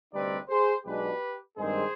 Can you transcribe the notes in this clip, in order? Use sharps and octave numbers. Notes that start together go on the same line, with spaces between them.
D2 C3 G3 C4 D#4 B4 D5
G#4 C5
B1 B2 G#3 D4 G4 B4
G2 D#3 G#3 C4 G#4 C5